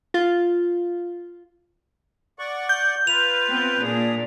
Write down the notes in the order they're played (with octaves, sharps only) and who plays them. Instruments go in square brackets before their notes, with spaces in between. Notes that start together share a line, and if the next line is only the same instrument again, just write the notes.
[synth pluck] F4
[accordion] D5 F#5 C#6
[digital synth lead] G6
[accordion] F4 B4 [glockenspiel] F7
[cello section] B3 C4
[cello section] A#2 D4 [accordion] G#4